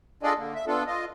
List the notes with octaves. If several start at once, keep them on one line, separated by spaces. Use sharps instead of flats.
D4 F4 G#4 A4 D5 D#5
D3 A#3
E5
B3 D4 F4 A4
F4 D#5